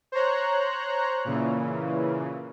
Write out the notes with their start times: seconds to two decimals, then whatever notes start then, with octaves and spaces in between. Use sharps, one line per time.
0.12 C5 C#5 A#5 F#6
1.25 A#2 C#3 E3